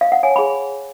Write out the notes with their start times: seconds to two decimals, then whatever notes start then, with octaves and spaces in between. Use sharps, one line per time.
0.01 F5
0.12 F#5
0.23 C#5 G#5
0.31 A5
0.36 G#4 B5